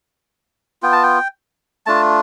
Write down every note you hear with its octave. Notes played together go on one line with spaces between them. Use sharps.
B3 F4 G5
A5
G5
A3 D4 F4 A5